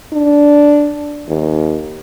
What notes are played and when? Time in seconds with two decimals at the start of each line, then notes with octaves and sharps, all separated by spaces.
0.13 D4
1.28 D#2